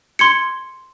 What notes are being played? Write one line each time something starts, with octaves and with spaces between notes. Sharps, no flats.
C6 G#6 C#7